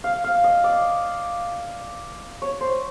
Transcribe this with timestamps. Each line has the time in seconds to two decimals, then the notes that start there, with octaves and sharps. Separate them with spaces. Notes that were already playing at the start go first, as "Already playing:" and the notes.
0.04 F5
0.24 F5
0.44 D#5
0.64 D5
2.42 C#5
2.61 C5